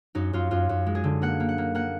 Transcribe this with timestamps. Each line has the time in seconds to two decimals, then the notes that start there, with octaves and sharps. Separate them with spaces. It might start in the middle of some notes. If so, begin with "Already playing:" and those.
0.15 F#2 D#4
0.33 F#2 F4
0.51 F#2 F4
0.69 F#2
0.86 G#3
0.95 G#4
1.04 D3
1.22 A#3 F#5
1.40 A#3
1.49 F#5
1.58 A#3
1.75 A#3 F#5